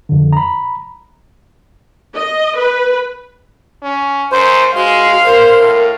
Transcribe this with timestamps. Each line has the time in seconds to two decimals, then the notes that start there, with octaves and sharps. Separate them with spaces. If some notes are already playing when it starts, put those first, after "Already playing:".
0.09 F2 D3
0.33 A#5 B5
2.16 D#5
2.57 B4
3.83 C#4
4.32 F#2 C5
4.75 G#3 F#4 F5 C6
5.25 A#4 C5
5.59 A2